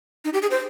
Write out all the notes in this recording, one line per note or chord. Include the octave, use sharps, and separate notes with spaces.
D#4
G4
G#4
C5